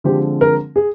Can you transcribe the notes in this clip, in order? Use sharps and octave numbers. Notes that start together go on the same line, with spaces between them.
D3 F3 G#3 C4 G4
A#4
G#4